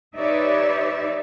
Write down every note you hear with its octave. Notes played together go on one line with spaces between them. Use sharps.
D#4 G4 B4 C#5 D5 E5